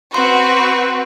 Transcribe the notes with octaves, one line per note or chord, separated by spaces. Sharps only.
C4 F#4 B4 C6